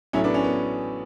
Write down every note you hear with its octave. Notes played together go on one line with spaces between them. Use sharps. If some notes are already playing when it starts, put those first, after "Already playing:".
A1 A2 F#3 A3 C#4 E4
B3 D4
C#4
B3